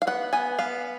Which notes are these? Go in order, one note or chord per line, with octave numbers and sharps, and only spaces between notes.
F5
B3 F#5
B3 G#5
B3 F5